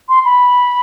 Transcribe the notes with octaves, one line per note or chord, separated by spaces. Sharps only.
C6
B5